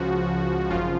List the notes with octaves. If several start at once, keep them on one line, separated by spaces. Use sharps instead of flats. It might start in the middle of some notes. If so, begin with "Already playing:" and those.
Already playing: C#2 C#3 F3 F#4
G#1 F#2 C#3 F3 F4